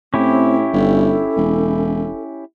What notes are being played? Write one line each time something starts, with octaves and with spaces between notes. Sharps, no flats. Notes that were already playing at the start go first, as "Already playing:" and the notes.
A2 C4 C#4 E4 G4
G1 A4
E1